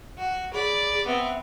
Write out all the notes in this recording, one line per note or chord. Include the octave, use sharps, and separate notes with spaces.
F#4
G#4 D5 B5
B3 C4 E5